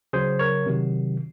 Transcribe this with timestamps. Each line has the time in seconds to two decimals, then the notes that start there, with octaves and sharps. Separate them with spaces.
0.13 C#3 F#3 G#4 C5
0.39 A#4 C#5
0.66 C3 D#3 F#3